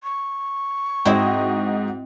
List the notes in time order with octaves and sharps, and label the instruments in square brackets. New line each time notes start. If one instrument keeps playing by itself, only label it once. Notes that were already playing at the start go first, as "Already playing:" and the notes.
[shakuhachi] C#6
[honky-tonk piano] G#2 F#4 D#5 [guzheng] C4 E4 C5